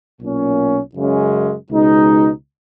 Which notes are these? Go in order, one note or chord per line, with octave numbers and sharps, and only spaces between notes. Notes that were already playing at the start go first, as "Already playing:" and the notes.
B1 A#2 A#3 C#4
F#2 C#3 G#3 C#4
C#2 B2 G#3 D#4